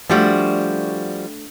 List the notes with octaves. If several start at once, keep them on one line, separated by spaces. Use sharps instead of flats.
F3 G3 A3 D4 F#4